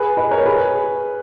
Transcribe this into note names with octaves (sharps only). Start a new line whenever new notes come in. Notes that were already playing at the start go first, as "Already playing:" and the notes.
Already playing: G#4 B4
B4 D#5
A#4 C#5
G#4 B4